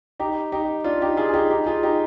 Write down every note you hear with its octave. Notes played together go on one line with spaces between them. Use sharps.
D#4 G4
D#4 G4
D4 F4
D#4 G4
F4 G#4
G#4
D#4 G4
D#4 G4
F4 G#4
D#4 G4